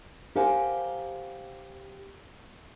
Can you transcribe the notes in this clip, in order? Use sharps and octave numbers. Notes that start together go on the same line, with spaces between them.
G4 A#4 C5 F5 F#5 G#5